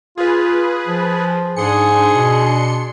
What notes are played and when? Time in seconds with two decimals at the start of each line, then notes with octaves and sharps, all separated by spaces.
0.18 F4 G#4 B4
0.87 F3
1.56 G#2 D4 G#4 C6 C#7
2.14 B2